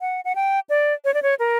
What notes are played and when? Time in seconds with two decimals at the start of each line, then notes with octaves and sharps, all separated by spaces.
0.01 F#5
0.25 F#5
0.35 G5
0.70 D5
1.05 C#5
1.14 D5
1.22 C#5
1.39 A#4